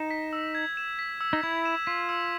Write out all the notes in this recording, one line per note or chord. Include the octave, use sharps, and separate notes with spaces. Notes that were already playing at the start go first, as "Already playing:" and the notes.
Already playing: D#4 E7
B6
E6
G#6
E7
B6
E6
D#4
E4 G#6
E7
F4 B6
E6